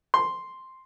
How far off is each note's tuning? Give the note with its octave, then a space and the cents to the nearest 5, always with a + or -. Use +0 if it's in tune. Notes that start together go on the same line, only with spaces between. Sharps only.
C6 +0